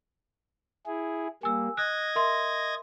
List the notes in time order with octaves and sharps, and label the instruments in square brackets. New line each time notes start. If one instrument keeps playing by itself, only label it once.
[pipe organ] E4 G#4
[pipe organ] G3 A#3 [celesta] G#5 E6
[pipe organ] D#5 G#6 A#6 [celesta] F#6
[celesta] A#4 E5 C6